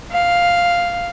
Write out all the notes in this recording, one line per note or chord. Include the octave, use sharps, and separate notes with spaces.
F5